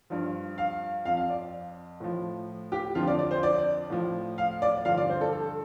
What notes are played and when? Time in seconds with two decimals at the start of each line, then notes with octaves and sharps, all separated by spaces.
0.10 G2 F3
0.58 F5
1.05 F2 F5
1.08 F3
1.17 F5
1.30 D5
2.00 A2 F3
2.72 G4
2.95 F2 D3 F3 F4
3.07 D5
3.19 D5
3.31 C5
3.43 D5
3.90 A2 F3
4.38 F5
4.62 D5
4.85 G2 D3 F3 F5
4.98 D5
5.10 C5
5.21 A4
5.33 A4